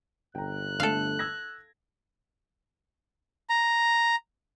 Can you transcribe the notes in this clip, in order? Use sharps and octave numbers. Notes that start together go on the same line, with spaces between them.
G1 G5 A#5 F#6
D3 A3 A4 F5
E6 G#6 A#6
A#5